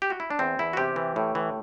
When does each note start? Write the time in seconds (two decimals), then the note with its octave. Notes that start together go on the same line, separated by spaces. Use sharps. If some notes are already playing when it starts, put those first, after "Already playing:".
0.02 G4
0.10 F#4
0.20 E4
0.30 D4
0.39 E2 C4
0.59 E2 E4
0.73 F#4
0.77 C3 G4
0.96 E3
1.16 A2
1.35 E3